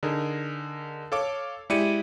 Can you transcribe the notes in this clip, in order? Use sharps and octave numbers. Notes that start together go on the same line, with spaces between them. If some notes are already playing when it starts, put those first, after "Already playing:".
D3 D#4 G#4 A#4
A4 C#5 F5 D6
G#3 E4 G4 D5 C#7 D#7